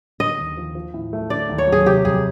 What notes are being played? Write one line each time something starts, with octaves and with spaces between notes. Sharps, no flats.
D3 D#5
D#2
F3
F3
A2
A3
D3 D5
D#2
C#5
F#3
G#4
C3 G4
F2 G#4